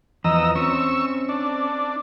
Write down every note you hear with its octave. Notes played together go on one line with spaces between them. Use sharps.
E2 F3 B3 D#5 A#5 E6
C4 C#4 C#6 E6
D4